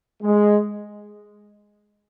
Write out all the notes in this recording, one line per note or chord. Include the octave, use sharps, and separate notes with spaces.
G#3